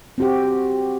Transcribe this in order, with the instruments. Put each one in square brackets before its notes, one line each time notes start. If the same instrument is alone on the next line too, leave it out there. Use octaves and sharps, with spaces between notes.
[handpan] C4 F#4 G4